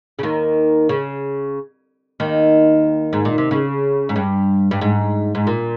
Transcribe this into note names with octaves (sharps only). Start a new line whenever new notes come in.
C#3
D#2 D#3
C#3
D#2 D#3
G#2
A#2
C3
C#3
G#2
G2
G2
G#2
G#2
A#2